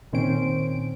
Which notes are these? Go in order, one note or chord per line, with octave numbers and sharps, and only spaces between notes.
A#2 D#3 C4 C#4 C5 D7